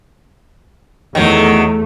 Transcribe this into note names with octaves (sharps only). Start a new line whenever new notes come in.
E2 D#3 F#3 A3